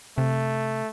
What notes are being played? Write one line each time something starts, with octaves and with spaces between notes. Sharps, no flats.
C3 A3